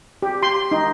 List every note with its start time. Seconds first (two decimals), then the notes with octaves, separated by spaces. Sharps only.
0.22 G4
0.43 C6
0.71 D#4